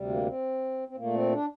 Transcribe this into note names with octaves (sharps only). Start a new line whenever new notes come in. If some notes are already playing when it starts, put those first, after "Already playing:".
Already playing: D2 C3 G3
A#3
C4
C4
A#2 A3 A#3
C4
D4